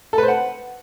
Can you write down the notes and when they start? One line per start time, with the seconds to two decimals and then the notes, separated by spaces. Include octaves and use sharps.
0.13 A4
0.18 B4
0.23 C5
0.28 F#5